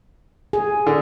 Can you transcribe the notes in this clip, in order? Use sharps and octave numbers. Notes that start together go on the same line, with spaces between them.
G#4
D3